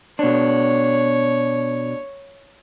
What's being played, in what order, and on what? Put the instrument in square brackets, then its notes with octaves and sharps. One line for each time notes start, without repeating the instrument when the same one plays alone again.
[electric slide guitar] B2 D4 [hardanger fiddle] C#5